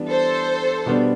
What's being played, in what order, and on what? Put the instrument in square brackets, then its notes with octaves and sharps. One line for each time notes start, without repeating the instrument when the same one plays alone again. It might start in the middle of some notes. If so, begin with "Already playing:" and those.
Already playing: [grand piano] E3 G3 B3 D4
[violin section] A4 C5
[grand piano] B2 G3 B3 D4